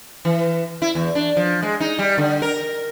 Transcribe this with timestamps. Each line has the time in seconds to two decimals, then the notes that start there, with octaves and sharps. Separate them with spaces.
0.25 E3
0.82 E4
0.95 E2
1.15 D4
1.37 F3
1.62 G#3
1.80 D#4
1.99 G3
2.18 D3
2.42 A#4